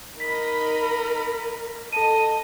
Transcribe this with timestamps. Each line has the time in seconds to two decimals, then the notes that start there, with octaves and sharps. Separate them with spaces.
0.20 D#4 A#4 D#5 B5 B6
1.92 A4 D#5 A5 D#7